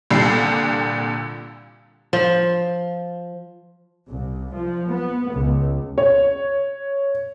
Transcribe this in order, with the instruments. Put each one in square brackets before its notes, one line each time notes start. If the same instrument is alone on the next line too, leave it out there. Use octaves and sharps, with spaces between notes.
[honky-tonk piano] C2 A#2 D3 G3 D4 C7
[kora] F3
[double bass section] C2
F3
B3
C#2
[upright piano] C#5